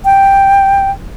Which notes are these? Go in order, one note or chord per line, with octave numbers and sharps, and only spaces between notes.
G5